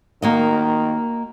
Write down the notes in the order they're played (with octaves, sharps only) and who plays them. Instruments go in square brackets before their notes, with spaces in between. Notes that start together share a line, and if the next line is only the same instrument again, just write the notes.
[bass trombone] D#3 [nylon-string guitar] A#3 F#4 D#5